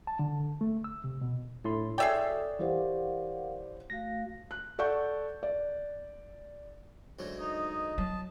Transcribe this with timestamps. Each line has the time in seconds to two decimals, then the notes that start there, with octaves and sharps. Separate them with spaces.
0.07 A5
0.19 D3
0.61 A3
0.84 E6
1.04 C3
1.21 B2
1.64 A2 D4 E4 A4 C6
1.98 F#4 G#4 A4 C#5 D5 E5 G5 D#6
2.59 E3 G4 A#4 C5 F5 F#5
3.90 A3 F#4 F5 A#6
4.51 F#6
4.79 A4 D5 F#5 C#6 G6
5.43 D5
7.19 D2 G#2 F#3
7.40 D#4 D#5
7.98 F#3 A5